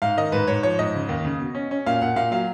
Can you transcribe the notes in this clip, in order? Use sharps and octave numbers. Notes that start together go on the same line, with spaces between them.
G#2 F5
D#3 D#5
G#2 B4
G#2 C#5
F3 C#5
G#2 D#5
C#3
D#2
C#3
B2
C#4
C#4
A#2 F5
A#2 F#5
A#2 F5
F#3 F5